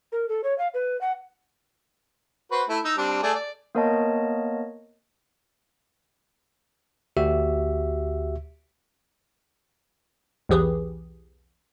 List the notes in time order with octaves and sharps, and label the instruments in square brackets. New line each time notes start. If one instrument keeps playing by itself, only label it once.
[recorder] A#4
A4
C#5
F5
B4
F#5
[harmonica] F#4 B4 C5
A3 E4
D#4 E6
G3 C4 D4
A3 G#4 D5
D5
[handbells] A#3 B3 A#4 C#5 D#5 A5
[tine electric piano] D2 F#4 G4 E5
[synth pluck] B1 E2 E3 G4 G#4 B4